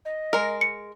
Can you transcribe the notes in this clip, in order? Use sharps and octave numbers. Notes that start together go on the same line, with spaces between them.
D#5
G#3 A#4
C#7